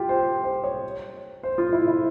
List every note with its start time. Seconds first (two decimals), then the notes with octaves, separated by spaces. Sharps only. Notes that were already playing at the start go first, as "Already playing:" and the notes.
Already playing: F4 G4
0.09 C5
0.44 C5
0.64 C#5
1.43 C5
1.58 F4
1.73 E4
1.88 E4